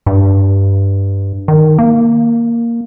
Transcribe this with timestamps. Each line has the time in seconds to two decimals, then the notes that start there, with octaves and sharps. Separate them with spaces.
0.07 G2
1.48 D#3
1.79 A#3